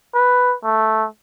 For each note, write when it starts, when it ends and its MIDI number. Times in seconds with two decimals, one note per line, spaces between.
0.14 0.55 71
0.64 1.06 57